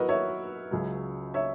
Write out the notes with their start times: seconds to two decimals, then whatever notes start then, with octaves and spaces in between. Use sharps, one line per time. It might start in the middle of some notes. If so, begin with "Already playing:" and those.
Already playing: F#3 B3 E4 F#4 A#4 B4 D#5
0.09 C#5 E5
0.71 C#2 C#3 F#3
1.34 C#5 E5